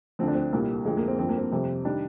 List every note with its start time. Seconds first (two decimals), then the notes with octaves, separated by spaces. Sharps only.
0.19 D2 D3 F3 C4
0.28 D4
0.35 C4
0.52 C2 A#2 G3 A#3
0.85 F2 D3 F3 G#3
0.97 A#3
1.08 C4
1.19 G2 F3 C4
1.29 A#3
1.38 C4
1.52 F2 C3 G3
1.85 D#3 G3 D4